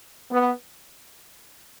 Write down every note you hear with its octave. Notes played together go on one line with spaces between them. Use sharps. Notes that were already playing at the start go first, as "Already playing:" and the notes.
B3